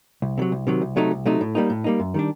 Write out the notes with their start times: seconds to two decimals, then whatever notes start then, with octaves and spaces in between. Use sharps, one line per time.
0.22 C2
0.38 C3 D#3
0.42 F#3
0.52 C2
0.67 C3 D#3 F#3
0.82 C2
0.96 C3 F#3 A3 D#4
1.11 C2
1.26 C3 F#3 A3 D#4
1.41 A2
1.55 G3 A#3 D#4
1.70 A2
1.84 G3 A#3 D#4
2.00 F#2
2.14 D#3 G3 D4